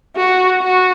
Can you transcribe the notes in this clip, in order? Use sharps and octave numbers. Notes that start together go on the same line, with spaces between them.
F#4
F#4